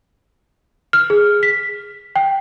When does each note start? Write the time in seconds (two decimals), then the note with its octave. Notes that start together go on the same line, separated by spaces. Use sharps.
0.93 F6
1.10 G#4
1.43 B6
2.16 G5